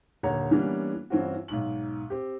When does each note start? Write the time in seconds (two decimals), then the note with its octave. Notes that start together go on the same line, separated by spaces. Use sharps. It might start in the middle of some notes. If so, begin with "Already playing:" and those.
0.23 D#1 D3 A#3 C#5 F#5 A#5
0.51 E3 G3 A#3 B3 C#4 D4
1.10 G2 E3 C4 C#4 F4 F#4
1.48 B1 G#2 F#7
2.10 C4 G4